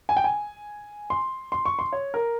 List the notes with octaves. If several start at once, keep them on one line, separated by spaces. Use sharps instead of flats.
G#5
G5
G#5
C6
C6
C#6
C6
C#5
A#4